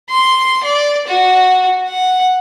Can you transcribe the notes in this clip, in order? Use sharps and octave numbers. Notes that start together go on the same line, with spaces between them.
C6
D5
F#4
F#5